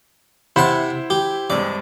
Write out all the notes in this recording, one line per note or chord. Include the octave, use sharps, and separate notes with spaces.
C3 E4 C5 F#5 A5 B5
G4
G2 C3 G#3 D5